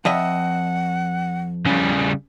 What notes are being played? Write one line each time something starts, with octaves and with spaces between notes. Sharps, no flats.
F2 D#5 E5 F#5
C#3 G3